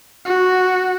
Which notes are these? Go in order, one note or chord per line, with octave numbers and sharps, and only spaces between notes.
F#4